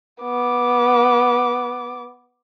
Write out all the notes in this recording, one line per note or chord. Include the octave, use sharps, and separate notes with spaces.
B3 D6